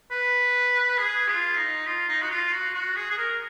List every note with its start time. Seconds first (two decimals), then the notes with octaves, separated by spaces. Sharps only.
0.11 B4
0.98 G#4
1.28 F4
1.57 D#4
1.87 F4
2.09 D#4
2.22 F#4
2.30 F4
2.53 F#4
2.74 F#4
2.96 G#4
3.11 G#4
3.18 A#4